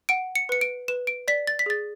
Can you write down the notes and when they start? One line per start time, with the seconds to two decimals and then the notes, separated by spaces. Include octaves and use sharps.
0.09 F#5 D7
0.35 C#7
0.49 B4 C#7
0.61 D7
0.88 B4 E7
1.07 D7
1.28 D5 B6
1.47 A6
1.59 B6
1.66 G#4 A6